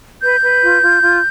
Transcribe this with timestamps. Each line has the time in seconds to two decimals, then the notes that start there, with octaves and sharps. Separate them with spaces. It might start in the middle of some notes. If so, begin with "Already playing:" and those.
0.22 B4 G6
0.42 B4
0.62 F4
0.82 F4
1.02 F4